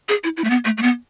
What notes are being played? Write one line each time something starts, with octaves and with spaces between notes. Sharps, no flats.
G#4
E4
E4
A3
B3
A3
A3
B3